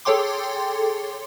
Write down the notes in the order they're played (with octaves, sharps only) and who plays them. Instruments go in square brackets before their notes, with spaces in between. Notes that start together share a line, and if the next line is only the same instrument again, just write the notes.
[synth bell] G#4 A4 C#5 G5 C6 D6